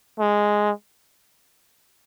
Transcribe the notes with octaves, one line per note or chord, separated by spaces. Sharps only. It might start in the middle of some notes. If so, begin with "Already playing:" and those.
G#3